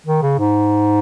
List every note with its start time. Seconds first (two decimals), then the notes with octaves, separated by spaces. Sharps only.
0.06 D#3
0.22 C#3
0.39 G#2